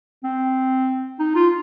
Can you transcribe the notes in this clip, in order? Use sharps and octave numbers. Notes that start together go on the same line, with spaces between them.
C4
D#4
F4